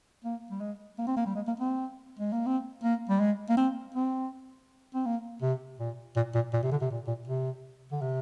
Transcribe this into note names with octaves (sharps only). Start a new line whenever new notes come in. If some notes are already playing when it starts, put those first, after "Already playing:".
A#3
G3
G#3
A#3
C4
A#3
G3
G#3
A#3
C4
G#3
A#3
C4
A#3
G3
G#3
A#3
C4
C4
C4
A#3
C3
A#2
A#2
A#2
A#2
C3
D3
C3
A#2
A#2
C3
D3
C3